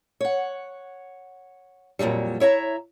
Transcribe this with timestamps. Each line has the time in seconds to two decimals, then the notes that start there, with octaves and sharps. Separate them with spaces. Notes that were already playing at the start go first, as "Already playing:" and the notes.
0.20 C#5 F#5
1.99 F2 A#2 E3 F#3 G3
2.40 E4 C#5 E5 A#5